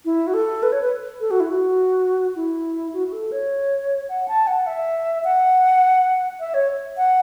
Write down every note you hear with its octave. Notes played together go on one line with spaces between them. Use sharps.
E4
F#4
A4
B4
C#5
B4
A4
F#4
E4
F#4
E4
F#4
F#4
A4
C#5
F#5
A5
F#5
E5
F#5
E5
C#5
F#5